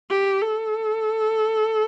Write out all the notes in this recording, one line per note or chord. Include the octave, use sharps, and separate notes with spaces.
G4
A4